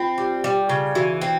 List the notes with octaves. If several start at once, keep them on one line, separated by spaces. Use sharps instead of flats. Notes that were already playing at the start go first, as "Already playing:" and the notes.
Already playing: C4 F4
G3
G3
C#3
E3 F#4
C4